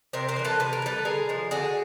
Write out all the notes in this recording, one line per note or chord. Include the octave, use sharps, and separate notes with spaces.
C3 A#4 C5
A#4 C5
E3 G3
A4 B4
C3 B4
A#4
E3
G3 A4 B4
D3 G#4 A#4
F3 G#3
D3 F#4 G#4